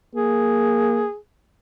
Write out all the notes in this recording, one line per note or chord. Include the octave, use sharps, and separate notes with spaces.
A#3 G#4